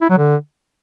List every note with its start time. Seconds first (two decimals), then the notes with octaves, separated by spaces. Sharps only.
0.01 E4
0.10 F#3
0.18 D3